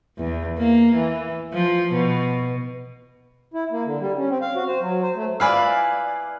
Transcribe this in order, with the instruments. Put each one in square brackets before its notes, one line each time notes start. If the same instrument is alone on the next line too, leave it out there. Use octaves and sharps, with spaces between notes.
[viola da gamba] E2
A#3
E3
F3
B2
[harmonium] E4
A#3
D3
G3
C#4
C4
F5
F#4
C5
F#3
C5
A3
[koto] E4 B4 D5 [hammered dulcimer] F5 G#5